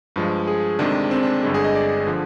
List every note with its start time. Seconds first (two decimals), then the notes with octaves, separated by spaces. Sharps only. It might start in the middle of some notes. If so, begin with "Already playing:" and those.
0.16 G2 F3 G#3
0.47 G#4
0.79 D2 C3 D#3 G#3 D4
1.11 C4
1.23 D4
1.43 G1 G2 D3 G#3
1.54 G#4
1.64 D#5
1.75 D5
2.07 D3 F3